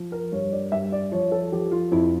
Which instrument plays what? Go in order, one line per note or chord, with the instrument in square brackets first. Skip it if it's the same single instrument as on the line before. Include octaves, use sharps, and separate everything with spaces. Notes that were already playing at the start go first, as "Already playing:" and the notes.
Already playing: [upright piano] F3
A#4
G2 C#5
D5
G2 E5
D5
F3 C#5
A4
F3 G4
F4
F2 E4